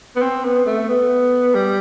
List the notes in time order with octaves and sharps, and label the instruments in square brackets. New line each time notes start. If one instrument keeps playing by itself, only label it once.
[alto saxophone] B3
C4
B3
A3
B3
G3